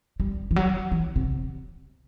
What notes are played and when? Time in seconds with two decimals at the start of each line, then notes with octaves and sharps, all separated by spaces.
0.20 G3
0.51 E3
0.56 F#3
0.92 E3
1.16 C3